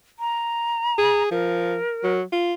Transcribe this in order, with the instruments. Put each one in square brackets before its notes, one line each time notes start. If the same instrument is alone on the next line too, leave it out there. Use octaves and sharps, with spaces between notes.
[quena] A#5
[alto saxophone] G#4
[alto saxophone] F3 [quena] A#4
[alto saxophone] F#3
F4